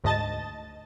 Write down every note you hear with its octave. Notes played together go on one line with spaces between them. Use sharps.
D2 G#2 D#5 A5 A6